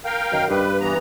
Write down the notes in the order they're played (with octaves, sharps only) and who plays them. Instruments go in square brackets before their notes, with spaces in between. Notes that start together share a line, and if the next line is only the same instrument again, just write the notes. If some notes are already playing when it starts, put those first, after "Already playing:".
[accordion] A#4 F5 G5
[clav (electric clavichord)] F#2 D#3
[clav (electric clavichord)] G2 [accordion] B4
[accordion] E3 B3 A#5